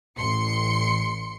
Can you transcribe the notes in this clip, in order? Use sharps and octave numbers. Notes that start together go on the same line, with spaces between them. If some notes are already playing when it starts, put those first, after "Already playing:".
A1 C6 C#7